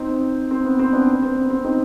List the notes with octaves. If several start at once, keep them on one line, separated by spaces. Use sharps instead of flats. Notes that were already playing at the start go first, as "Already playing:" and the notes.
Already playing: C4 D#4
C4
B3
C4
B3 D4
C4
B3
C4
C4 D#4